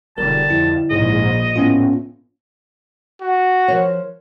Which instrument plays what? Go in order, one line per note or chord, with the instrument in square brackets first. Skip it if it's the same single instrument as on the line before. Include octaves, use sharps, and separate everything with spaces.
[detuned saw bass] E1 [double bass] D3 G3 [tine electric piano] A#4 [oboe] A5
[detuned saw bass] F2 [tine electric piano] E4
[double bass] A#1 [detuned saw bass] G#2 [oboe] D#5
[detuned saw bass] A2 [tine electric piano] B3 C#4 F4
[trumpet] F#4
[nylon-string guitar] F3 A#4 C#5